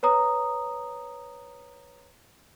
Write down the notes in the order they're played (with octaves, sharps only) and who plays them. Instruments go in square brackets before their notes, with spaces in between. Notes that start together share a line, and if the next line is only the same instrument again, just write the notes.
[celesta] B4 C#5 A#5 D#6